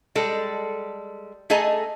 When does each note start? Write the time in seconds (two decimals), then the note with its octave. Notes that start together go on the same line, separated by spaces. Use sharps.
0.15 G3 G#3 A4
1.50 A3 G#4 A4 D#5 G#5 A#5